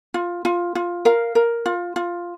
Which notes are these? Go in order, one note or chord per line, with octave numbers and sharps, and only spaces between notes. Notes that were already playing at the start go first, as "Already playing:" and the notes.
F4
F4
F4
A#4 F5
A#4
F4
F4